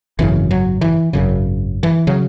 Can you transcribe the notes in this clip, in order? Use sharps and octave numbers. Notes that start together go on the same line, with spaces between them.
G#1 F#2 C#3 E3
F#3
E3
G#1 F#2 C#3
E3
C#3 F#3